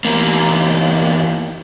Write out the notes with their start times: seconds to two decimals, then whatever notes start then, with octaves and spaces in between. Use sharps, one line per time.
0.05 E2 A#3